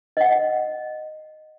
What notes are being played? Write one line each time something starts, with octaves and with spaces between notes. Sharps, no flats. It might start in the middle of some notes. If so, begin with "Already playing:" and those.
D#5 F#5